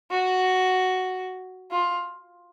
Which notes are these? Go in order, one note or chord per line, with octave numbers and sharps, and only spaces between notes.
F#4
F4